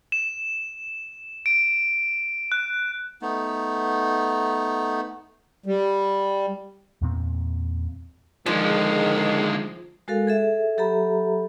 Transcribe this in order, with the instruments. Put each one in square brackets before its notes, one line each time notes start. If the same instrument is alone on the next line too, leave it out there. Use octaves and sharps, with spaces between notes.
[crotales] E7
D7
F#6
[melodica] A3 B3 D#4
[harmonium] G3
[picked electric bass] E2 A#2 C4
[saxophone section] F2 D4 G#4 [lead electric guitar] D3 G#3 [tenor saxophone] D#3 [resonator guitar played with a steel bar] F3
[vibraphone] G#3 F#4 A4 A#4 F5
G#4 A4 E5
F#3 G4 A4 E5 A#5 B5